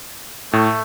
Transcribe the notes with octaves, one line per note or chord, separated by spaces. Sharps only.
A2 A3